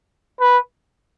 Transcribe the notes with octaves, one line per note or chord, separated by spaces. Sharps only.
B4